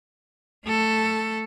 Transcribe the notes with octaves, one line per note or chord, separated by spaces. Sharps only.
A3 A4